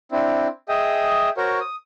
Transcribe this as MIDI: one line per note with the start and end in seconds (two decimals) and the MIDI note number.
0.12 0.48 60
0.12 0.48 62
0.12 0.48 64
0.69 1.29 68
0.69 1.29 75
0.69 1.29 76
0.69 1.29 79
0.69 1.29 87
1.37 1.59 66
1.37 1.59 70
1.37 1.59 72
1.37 1.59 73
1.61 1.76 87